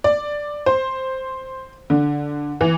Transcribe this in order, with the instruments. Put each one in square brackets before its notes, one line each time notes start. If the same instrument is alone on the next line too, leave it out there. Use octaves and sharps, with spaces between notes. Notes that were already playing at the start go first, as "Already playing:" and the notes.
[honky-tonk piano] D5
C5
D3
E3